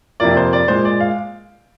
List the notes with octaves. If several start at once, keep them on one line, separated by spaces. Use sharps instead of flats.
F2 C3 F3 A#3 D5
C5
D5
A#2 G#3 C5
D5
F5